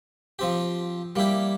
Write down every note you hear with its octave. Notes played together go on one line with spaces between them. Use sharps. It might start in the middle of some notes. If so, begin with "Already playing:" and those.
F3 C4 G4
G3 A#3 E4 G4